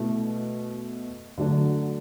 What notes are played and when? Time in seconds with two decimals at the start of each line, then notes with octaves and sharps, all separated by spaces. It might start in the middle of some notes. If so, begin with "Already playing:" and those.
Already playing: B2 A3 E4
1.38 D3 F#3 A3 D4